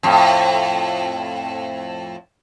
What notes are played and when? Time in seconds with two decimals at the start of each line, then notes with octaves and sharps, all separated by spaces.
0.03 F2 A2